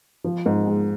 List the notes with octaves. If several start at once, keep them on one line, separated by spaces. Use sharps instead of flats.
F3
G#2
G#3